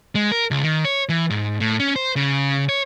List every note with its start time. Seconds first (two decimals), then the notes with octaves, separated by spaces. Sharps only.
0.15 G#3
0.31 A#4
0.51 C#2
0.63 D#3
0.85 C#5
1.09 E3
1.30 G#2
1.60 A2
1.80 C#4
1.96 C5
2.16 C#3
2.69 C#5